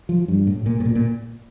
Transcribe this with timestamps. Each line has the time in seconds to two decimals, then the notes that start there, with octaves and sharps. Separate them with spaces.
0.09 F3
0.28 G2
0.47 A2
0.66 A#2
0.80 A2
0.85 A#2
0.95 A#2